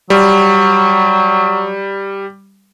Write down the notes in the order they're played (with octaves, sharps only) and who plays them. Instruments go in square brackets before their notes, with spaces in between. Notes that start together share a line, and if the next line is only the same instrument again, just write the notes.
[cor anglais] F#3 [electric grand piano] G3